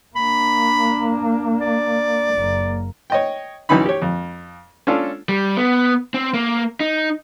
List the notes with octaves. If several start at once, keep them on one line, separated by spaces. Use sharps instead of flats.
A#3 D4 B5
D5
F#1 A#3
C#5 D#5 G5
B1 E3 C#4 D#4 B5
G4 C#5
F2
C#4 D4 F4 A4
G3
B3
C4
A#3
D#4